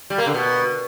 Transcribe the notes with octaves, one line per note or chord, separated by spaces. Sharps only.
G3
A#3
D3
B2